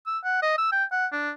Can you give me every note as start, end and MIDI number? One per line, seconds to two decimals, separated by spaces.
0.07 0.18 88
0.24 0.41 78
0.42 0.54 75
0.58 0.71 88
0.72 0.84 79
0.92 1.06 78
1.12 1.31 62